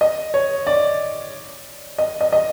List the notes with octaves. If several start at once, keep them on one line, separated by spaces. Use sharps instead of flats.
D#5
C#5
D5
D#5
D#5
D#5